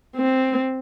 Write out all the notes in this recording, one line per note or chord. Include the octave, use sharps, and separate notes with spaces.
C4